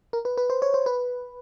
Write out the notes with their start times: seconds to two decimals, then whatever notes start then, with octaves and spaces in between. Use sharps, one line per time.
0.13 A#4
0.25 B4
0.38 B4
0.50 C5
0.62 C#5
0.74 C5
0.86 B4